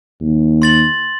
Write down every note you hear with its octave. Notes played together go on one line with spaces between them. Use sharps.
D#2
C6 A6 F#7